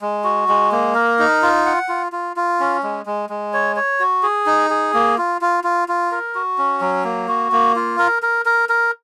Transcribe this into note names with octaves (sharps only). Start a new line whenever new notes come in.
G#3
F#4
G#3
A#3
A#4
D#4
F4
F#5
F4
F4
F4
C#4
G#3
G#3
G#3
C#5
C#5
F#4
G#4
D#4
G#4
A#3
F4
F4
F4
F4
A#4
F#4
C#4
F#3
A#3
F#4
A#3
F4
A#4
A#4
A#4
A#4